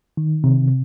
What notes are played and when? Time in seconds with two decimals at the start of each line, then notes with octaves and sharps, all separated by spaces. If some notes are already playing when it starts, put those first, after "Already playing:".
0.17 D#3
0.44 C3